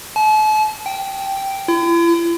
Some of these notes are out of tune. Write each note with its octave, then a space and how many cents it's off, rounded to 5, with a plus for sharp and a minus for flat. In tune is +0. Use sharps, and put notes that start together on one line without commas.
A5 -40
G5 -5
E4 +45